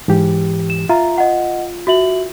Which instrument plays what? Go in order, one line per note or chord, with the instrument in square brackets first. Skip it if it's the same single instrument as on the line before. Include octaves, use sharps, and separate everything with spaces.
[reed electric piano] G#2 E3 G4
[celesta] E7
[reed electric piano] F4 [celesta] E5 A#5
[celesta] D#5 F#5
F#4 E5 F#7